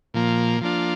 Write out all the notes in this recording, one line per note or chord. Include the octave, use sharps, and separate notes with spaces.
A#2 F3 A#3
F3 A#3 D4 F4